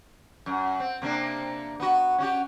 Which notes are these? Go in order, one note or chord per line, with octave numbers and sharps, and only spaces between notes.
F#2
C4
C3 A#3 D4
B3 F#4
C#4 F#4 G4